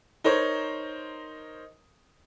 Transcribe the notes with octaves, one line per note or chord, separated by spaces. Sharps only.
D#4 A#4 C5 C#5